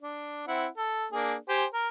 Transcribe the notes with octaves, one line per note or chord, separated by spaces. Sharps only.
D4
C4 E4 F#5
A4
A#3 D4 G#4
G4 C5 G#5
A#4